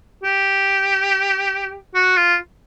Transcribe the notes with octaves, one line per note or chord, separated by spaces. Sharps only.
G4
F#4
F4